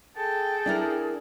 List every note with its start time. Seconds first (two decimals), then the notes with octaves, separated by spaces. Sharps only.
0.17 G#4 A4 G5 A5
0.66 D4 E4 A#4